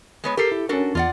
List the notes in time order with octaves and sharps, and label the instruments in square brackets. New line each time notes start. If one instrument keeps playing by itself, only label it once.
[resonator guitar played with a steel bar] G#3 B3 C#5
[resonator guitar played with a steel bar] G4 A4 [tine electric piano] A#4 C7
[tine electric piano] E4
[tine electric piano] C#4 A#4 [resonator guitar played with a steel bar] D4 F#4 A4
[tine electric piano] E2 [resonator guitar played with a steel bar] F4 D5 F#5